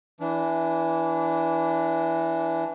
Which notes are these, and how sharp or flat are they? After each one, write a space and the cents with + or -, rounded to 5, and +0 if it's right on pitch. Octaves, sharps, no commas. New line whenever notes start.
E3 +0 D4 -25